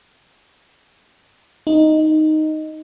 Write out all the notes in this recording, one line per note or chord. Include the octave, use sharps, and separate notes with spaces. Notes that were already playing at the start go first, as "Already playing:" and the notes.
D#4